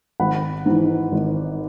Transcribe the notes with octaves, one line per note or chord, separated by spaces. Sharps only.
G#1 F#5 B5
G#2 E3
G#1